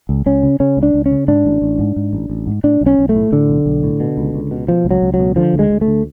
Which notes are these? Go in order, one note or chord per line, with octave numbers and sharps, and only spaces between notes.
C#2
C#2 C#4
C#3
C#3 C#4
C#2
D4
C#2
C#4
C#3
G#2 D4
A1
A1
G#2
G#2
A1
A1
G#2
A2 D4
B1
C#4
B1
A3
A2
A2 D3
B1
B1
A2
B2
C#2
C#2
B2
B2 F3
C#2
F#3
C#2
F#3
B2
D3 F3
D2
G#3
D2
A3
D3